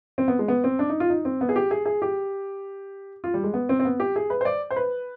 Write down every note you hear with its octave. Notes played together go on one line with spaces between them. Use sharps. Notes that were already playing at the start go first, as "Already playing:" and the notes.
C4
B3
G#3
B3
C4
D4
D#4
F4
D#4
C4
B3
G#4
G4
G#4
G#4
G4
F4
G3
G#3
B3
C4
C4
B3
G4
G#4
B4
C5
D5
C5
B4